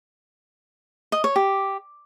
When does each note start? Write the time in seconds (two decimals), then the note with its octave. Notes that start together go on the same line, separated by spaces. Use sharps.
1.12 D#5
1.24 C#5
1.36 G4